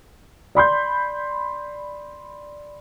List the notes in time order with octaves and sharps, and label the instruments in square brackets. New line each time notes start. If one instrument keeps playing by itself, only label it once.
[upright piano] D5 B5 C6 G6